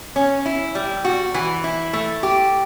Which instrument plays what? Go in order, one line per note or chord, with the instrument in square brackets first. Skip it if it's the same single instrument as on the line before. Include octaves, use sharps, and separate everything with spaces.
[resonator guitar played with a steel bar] C#4
E4
G3
F#4
E3
E4
A3
G4